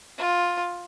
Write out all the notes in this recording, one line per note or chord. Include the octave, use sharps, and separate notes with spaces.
F4